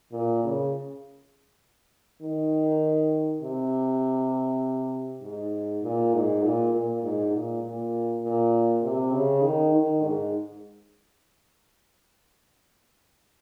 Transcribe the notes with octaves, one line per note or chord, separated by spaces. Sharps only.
A#2
C#3
D#3
C3
G#2
A#2
G#2
A#2
A#2
G#2
A#2
A#2
A#2
C3
C#3
D#3
D#3
G#2